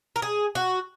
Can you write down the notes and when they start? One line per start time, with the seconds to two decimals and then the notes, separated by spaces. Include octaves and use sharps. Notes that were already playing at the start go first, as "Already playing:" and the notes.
0.16 A#4
0.22 G#4
0.55 F#4